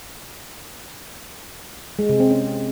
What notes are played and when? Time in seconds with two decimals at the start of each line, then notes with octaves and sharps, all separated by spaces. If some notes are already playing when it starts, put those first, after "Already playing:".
1.99 G#3
2.09 C3
2.20 C4
2.31 C#4